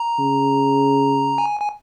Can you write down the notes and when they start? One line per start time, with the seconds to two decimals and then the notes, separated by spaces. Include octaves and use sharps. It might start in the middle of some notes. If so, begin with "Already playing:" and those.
Already playing: A#5
0.19 C#3
1.38 G#5
1.61 G#5